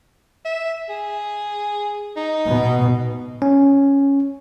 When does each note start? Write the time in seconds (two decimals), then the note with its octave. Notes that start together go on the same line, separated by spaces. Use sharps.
0.45 E5
0.89 G#4
2.16 D#4
2.49 B2
3.42 C#4